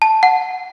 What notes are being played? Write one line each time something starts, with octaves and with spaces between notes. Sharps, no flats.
A5
F#5